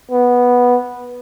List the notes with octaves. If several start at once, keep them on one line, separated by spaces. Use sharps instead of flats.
B3